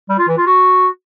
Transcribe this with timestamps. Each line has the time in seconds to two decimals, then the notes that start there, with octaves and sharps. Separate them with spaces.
0.09 G3
0.19 F4
0.28 E3
0.37 F4
0.47 F#4